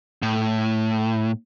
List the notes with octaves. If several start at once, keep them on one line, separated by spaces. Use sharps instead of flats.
A2